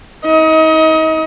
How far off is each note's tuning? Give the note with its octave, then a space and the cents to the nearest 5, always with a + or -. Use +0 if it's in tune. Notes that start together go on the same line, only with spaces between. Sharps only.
D#4 +40 D#5 +30